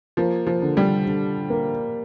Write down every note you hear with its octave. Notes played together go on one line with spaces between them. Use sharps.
F3 A#3
F3
D3
G3
D3
A#3